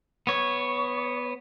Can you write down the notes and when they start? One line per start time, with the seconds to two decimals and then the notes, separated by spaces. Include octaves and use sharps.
0.27 B3 C#5